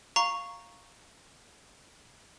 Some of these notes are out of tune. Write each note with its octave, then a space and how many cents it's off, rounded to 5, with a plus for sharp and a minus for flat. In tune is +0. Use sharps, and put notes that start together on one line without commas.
F5 +0 A#5 +0 C#6 +0